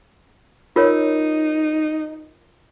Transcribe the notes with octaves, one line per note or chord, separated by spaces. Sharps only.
D#4 F4 A#4 C#5